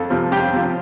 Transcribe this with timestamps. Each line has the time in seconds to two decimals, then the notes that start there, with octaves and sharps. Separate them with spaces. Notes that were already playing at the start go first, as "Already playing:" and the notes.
Already playing: F2 A4
0.10 C3 F3
0.31 F2 G4
0.53 C3 F3